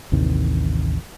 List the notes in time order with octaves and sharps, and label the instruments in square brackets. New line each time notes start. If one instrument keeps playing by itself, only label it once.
[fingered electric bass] A1 D#2 C3 D#3